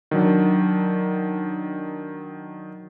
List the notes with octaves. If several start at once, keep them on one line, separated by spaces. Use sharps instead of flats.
D#3 F#3 D4